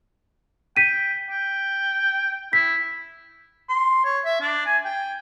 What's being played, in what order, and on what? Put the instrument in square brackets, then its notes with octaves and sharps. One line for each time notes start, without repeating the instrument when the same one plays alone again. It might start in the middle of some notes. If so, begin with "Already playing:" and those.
[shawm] G5 [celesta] B6 D#7
[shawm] G5
[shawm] E4 [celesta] B6
[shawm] C6
C#5
E5
D4
G#5
G5